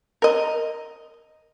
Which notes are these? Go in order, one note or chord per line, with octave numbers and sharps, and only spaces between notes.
A#4 D#5